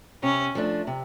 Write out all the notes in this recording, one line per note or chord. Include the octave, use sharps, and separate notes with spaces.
C3 C#4
F3 A3 D4
C3